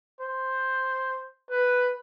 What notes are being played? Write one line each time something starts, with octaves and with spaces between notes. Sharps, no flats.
C5
B4